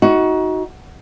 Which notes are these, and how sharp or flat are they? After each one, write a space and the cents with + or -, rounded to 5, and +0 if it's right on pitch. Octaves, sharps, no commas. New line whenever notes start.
D#4 +30 F#4 +5